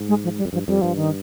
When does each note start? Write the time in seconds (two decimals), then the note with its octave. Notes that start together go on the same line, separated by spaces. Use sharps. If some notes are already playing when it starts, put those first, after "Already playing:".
Already playing: G#2
0.09 G#3
0.24 F3
0.38 G3
0.45 F2
0.53 G2 F3
0.67 F2 G3
0.82 G2 F3
0.96 D#3